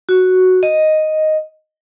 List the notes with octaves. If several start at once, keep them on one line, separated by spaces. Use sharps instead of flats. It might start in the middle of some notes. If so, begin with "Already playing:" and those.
F#4
D#5